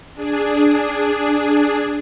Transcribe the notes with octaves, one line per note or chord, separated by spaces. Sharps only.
D4 G#4